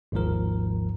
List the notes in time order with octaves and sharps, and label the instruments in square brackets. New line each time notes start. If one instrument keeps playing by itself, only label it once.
[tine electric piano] G#1 D#2 G#2 F3 A#4